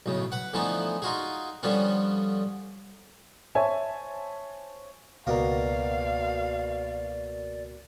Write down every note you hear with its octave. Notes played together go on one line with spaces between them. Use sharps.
B1 A2 C#3
B4 F#5
D3 E3 F3 A3 B3 D#4
D#4 F4 F#4 G#4
D3 F3 G3 B3 C#4
C5 C#5 E5 G#5 A5
C#2 B2 A#3 F#4 A#4 D5 F5